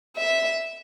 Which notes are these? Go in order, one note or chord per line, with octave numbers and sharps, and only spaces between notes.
E5